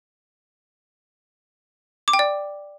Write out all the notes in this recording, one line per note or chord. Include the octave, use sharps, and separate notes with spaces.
D6
G5
D5